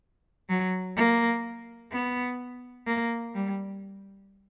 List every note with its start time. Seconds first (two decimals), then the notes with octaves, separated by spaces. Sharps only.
0.49 F#3
0.97 A#3
1.92 B3
2.87 A#3
3.35 G3